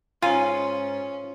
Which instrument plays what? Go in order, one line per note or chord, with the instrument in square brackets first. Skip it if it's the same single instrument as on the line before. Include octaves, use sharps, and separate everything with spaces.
[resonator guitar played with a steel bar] G#2 G#5 [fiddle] C#4 [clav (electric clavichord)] F4